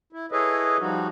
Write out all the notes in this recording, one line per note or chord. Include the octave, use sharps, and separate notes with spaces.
E4
E4 G#4 A4 B4 C#5 D#5
F3 G3 D#4 F#4